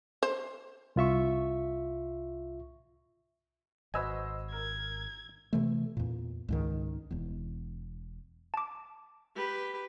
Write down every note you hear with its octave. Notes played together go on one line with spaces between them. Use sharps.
C5
C2 F4 E5 C#6
G#1 F#4 B4 C5 D#5 G#5 E6
A#4 G#6
C3 E3 A3
E2 A#2
C#2 G#2 D#3
E1 E2
A5 D6
G4 B4